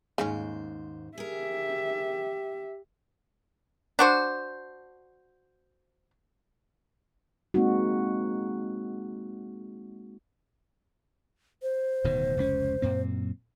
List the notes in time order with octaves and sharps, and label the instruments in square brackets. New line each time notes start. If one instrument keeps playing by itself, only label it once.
[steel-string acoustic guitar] D#2 G#2 C5 [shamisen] C#3 C#4
[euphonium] G4 [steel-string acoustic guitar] G#4 A#4 [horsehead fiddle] E5
[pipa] D4 F#4 C5
[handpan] G#3 A#3 C4 D#4 F#4
[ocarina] C5
[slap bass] D1 B2 D#3
F1 C#2 C#4
F#2 A#2 C4